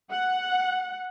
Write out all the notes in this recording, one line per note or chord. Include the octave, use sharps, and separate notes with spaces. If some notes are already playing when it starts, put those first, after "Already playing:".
F#5